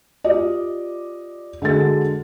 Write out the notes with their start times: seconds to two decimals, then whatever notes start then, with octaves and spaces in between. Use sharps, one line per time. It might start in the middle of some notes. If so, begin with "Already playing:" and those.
0.24 F4 G4 D5 D#5
1.62 D3 G#3 F#4 A4 A6